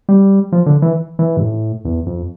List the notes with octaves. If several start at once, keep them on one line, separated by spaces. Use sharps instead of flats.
G3
F3
D3
E3
E3
G2
A2
E2
F2